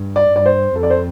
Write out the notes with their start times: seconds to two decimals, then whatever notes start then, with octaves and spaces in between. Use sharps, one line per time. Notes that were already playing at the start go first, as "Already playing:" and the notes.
Already playing: G2
0.16 D5
0.32 G2 D5
0.46 C5
0.76 F2 A4
0.83 D5
0.90 C5